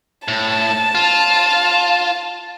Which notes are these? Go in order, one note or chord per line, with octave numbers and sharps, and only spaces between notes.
A2 A5
F4